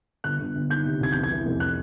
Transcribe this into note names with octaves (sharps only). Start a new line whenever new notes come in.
G1 F#6
G1
G1
D#3 G6
C3
C2 G#6
E2 G6
G#6
E3
F1
F#6